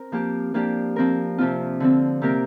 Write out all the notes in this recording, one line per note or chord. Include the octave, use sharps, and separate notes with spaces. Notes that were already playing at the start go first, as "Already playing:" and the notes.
Already playing: C4 A#4
F3 A#3 G4
F3 A#3 D4 G4
F3 C4 A#4
C3 F3 C4 F4
D3 F3 C4
C3 A#3 G4 A#4